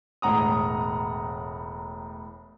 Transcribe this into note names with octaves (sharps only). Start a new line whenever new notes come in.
E1 A2 F#5 A#5 D#6